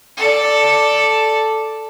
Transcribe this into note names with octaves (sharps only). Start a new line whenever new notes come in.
A4 D5